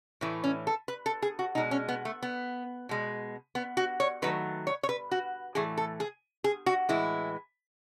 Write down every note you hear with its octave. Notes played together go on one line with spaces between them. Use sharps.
A2 E3 A3
C#4
A4
B4
A4
G#4
F#4
B2 G#3 D#4
C#4
B3
A3
B3
B2 G#3
B3
F#4
C#5
D#3 F#3 A3 B4
C#5
C#5
B4
F#4
A2 E3 A3 G#4
A4
G#4
G#4
F#4
A2 E3 G#3 E4